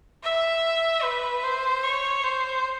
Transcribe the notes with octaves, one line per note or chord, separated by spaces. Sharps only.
E5
B4
C5
C#5
C5